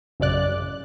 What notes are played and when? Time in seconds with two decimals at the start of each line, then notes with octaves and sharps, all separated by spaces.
0.20 A1 F#2 C#3 D5 F#6